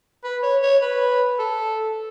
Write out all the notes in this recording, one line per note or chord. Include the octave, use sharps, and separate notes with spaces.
B4
C#5
C#5
B4
A4